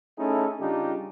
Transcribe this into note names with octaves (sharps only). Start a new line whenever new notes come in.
A3 C#4 D#4 E4 G#4 A4
C#3 G3 D4 D#4 F4 G4